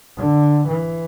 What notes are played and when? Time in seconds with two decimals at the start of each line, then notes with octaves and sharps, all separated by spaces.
0.17 D3
0.67 E3